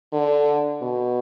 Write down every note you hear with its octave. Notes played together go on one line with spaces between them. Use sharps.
D3
B2